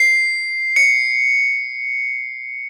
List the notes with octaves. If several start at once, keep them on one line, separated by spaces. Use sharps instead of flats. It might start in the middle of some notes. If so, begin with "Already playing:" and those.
Already playing: C7
C#7